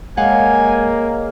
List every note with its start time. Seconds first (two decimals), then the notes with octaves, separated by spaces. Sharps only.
0.17 G#3 A#3 G#4 C#5 D#5 F5 F#5 G#5